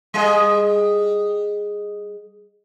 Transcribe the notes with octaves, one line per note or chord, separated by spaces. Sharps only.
G3 G#4 D#5